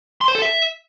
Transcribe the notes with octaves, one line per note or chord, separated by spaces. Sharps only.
C6
C5
A4
E5